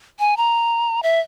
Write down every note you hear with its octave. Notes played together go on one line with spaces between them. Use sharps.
G#5
A#5
E5